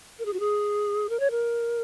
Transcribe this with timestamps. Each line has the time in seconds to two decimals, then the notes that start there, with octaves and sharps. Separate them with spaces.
0.19 A#4
0.25 G#4
0.33 F#4
0.40 G#4
1.09 A#4
1.20 C#5
1.31 A#4